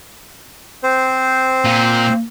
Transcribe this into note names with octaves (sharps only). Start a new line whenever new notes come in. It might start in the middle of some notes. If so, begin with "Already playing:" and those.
C4 C5
A#2